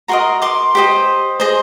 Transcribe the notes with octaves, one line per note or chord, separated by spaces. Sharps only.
F#4 A#4 D#5 A#5 C6
C6 D6
G4 C5 D#5
G#4 C5 D#5